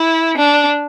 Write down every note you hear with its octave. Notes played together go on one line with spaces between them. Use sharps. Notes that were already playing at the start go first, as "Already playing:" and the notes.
Already playing: E4
D4